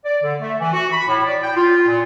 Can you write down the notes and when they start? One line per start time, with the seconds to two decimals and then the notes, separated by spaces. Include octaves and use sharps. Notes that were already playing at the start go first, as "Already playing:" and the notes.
0.04 D5
0.23 D3
0.40 A3
0.60 E3
0.73 F#4
0.91 B5
1.08 A2
1.25 D5
1.42 G5
1.55 F4
1.87 A#2